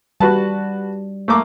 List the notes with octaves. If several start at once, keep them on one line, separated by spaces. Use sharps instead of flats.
G3 F#4 B4 A5
A3 A#3 D6